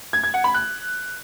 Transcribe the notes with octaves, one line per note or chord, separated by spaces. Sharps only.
G#6
G#6
F#5
B5
F#6